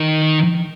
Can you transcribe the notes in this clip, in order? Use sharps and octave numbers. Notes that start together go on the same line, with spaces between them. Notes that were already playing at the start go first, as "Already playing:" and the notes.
Already playing: D#3